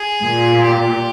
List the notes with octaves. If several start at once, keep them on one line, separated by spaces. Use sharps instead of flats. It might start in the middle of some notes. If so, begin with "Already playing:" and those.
Already playing: G#4
A#2
G4